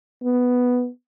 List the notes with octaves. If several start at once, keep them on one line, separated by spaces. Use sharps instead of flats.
B3